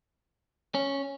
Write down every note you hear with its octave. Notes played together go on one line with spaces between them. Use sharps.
C#4